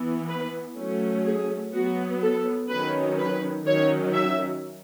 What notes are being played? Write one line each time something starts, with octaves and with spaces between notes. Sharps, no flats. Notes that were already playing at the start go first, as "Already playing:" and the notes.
Already playing: E3 B3
B4
F#3 A3 C#4
G#4
F#3 B3 F#4
A4
D#3 F#3 C#4 B4
B4
D#3 F#3 C#4 C#5
E5